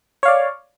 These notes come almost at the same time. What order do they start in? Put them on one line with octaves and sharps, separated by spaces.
C#5 F5 D5